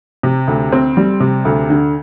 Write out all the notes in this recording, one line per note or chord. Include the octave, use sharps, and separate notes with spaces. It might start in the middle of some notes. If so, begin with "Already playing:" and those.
C3
D2
C4
G3
C3
D2
D3